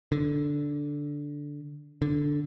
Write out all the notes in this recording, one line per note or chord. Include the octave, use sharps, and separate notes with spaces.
D3
D3